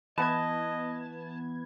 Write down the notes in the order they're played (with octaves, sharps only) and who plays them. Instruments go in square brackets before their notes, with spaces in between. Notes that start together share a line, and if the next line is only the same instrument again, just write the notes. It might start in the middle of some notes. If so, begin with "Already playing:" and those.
[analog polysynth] E3 B3 G#6 [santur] B4 [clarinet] D#5 [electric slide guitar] A5